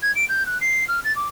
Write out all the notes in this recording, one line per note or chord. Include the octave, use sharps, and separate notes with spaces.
G#6
D7
G6
F#6
C7
F6
A6
D6